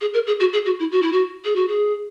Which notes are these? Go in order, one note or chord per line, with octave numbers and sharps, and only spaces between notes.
G#4
A#4
G#4
F#4
G#4
F#4
E4
F#4
E4
F#4
G#4
F#4
G#4